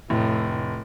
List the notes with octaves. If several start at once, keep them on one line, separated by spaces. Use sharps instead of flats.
F1 A2